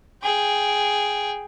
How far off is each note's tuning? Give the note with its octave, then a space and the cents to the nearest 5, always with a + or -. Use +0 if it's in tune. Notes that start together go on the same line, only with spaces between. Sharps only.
G#4 +0 G5 +0